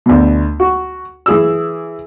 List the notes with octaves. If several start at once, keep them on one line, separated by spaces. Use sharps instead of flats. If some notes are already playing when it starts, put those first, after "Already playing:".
D2 B2
F#4
E3 G#4 E6